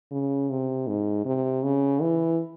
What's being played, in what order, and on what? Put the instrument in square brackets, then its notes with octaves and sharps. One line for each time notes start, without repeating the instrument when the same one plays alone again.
[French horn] C#3
C3
G#2
C3
C#3
E3